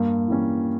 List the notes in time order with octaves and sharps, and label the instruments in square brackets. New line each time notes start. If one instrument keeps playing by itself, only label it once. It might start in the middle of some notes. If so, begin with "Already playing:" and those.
Already playing: [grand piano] G2 [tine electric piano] A#3
[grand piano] E3 G3 C#4